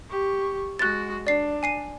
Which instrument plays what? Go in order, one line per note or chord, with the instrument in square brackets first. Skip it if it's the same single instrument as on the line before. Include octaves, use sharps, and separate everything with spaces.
[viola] G4 C#6
[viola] G#3 F#4 [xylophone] F#6 A6
[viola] D4 [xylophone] D5 C7
[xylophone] G#5 C7 D#7